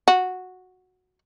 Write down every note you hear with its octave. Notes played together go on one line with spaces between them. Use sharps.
F#4